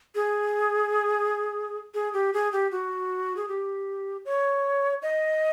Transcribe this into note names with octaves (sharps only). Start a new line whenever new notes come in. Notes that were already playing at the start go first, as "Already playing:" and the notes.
G#4
G#4
G4
G#4
G4
F#4
G#4
G4
C#5
D#5